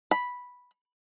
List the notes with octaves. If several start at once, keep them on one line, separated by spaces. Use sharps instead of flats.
B5